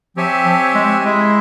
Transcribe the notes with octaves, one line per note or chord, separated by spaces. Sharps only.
F3 C4 G4 C#5 E5 G#5
F3
G#3
G#3 E4 G#4 E5